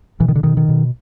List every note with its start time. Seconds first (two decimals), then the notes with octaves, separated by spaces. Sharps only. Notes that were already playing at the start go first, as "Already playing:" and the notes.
0.20 B2 E3
0.29 D#3
0.35 D3
0.44 B2 D#3
0.57 D#3
0.69 B2